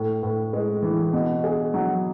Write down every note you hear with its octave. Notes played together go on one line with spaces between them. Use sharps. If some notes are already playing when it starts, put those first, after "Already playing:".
Already playing: A2
A2
G#3
E3
B2
G#4
F#3